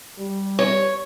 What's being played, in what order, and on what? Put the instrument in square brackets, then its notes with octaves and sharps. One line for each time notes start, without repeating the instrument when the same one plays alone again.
[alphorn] G3
[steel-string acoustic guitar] C#5